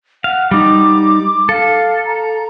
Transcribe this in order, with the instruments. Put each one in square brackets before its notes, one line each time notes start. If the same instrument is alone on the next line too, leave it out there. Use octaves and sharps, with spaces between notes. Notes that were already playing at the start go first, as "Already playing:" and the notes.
[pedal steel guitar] F5 [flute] F#5
[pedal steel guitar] G3 D#4 [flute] D6
[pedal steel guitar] A4 [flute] F5
[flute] A#5